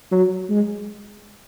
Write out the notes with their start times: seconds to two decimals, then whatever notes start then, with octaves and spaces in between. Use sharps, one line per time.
0.11 F#3
0.50 G#3